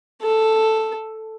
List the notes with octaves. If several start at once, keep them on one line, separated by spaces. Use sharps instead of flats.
A4